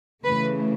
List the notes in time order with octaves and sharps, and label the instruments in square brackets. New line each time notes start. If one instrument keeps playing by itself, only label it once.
[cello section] C#3 E3 A3 B4